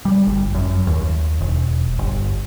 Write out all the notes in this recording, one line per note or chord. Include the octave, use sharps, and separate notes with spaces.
G3
G1
F#2
D#2
E1
G1